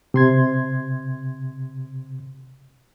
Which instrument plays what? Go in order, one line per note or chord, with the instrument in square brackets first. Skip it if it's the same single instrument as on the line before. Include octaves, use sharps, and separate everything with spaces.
[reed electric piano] C3 C6 G#6